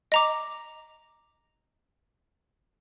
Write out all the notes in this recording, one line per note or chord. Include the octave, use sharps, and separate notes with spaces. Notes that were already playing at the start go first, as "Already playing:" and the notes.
D#5 A#5 D6